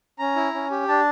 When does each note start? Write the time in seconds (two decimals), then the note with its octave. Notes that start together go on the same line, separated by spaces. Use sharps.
0.19 C#4 A#5
0.36 E4
0.55 C#4
0.71 G4
0.88 D4 A5